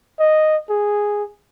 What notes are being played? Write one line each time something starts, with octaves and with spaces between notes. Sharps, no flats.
D#5
G#4